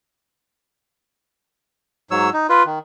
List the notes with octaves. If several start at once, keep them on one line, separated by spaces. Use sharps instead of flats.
G#2 F#3 C#5 E6
D#4
F4 B4
D#3